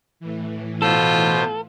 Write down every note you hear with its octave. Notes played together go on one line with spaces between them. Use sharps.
A2 E3
B2 F4 A4 C5